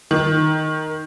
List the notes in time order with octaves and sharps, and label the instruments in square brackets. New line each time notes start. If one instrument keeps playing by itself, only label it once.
[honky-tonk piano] D#3